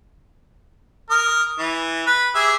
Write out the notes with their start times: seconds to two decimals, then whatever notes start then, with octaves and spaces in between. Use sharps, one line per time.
1.11 A#4 D#6
1.58 E3
2.07 B4
2.35 G4 G#4 E5